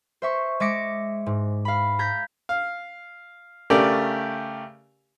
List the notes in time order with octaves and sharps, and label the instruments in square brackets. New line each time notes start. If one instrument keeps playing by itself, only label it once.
[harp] C5 E5 C#6
G#3 E5 D6 A#6 C#7 D7
G#2
F5 B5
A#5 G6 G#6 B6
[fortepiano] F5
C#3 A3 G4 A#4 D5